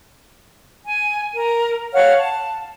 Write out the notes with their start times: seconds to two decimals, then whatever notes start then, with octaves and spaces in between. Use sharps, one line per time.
0.85 G#5
1.36 A#4
1.93 C#5 F5 F#5 F6
2.18 A5